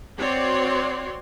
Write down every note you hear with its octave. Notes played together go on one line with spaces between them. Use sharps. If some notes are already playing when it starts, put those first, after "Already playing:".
C4 F#4 C#5 D5 C6